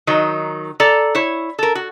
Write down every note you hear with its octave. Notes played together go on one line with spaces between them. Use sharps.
D#3 F#3 D#4
A4 D5 A#5
E4 C#5
A4 A#4
F#4